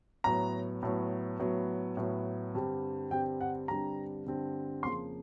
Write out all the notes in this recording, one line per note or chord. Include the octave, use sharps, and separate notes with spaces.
A2 F#3 B3 A#5
A2 F#3 B3
A2 F#3 B3
A2 F#3 B3
G2 D3 G3 C4
G2 D3 G3 C4 G5
F#5
G2 D3 G3 C4 A#5
G2 D3 G3 C4
F2 C#3 F3 A#3 C6